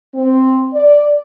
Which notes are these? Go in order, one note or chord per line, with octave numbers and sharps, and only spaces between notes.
C4
D5